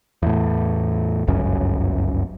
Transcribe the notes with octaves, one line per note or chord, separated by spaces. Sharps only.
E2 A2
G1 C#2 F#2 C#4